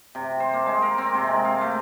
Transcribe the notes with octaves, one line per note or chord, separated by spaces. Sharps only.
C3
C5
A#3
G#3
A#4
C4
C3
G#3
F5
A3